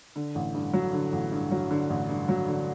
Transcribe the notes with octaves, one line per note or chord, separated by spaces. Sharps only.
D3
A1
G2
F#3
D3
A1
G2
F#3
D3
A1
G2
F#3
D3